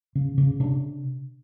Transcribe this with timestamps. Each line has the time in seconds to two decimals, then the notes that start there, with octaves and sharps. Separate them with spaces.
0.15 C#3
0.38 C#3
0.60 C3 D4